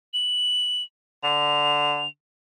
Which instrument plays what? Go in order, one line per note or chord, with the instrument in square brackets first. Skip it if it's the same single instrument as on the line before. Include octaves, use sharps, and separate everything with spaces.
[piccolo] F#7
[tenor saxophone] D3 [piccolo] F7